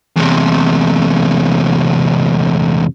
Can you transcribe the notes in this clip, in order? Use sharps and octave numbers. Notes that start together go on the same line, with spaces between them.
E2 C3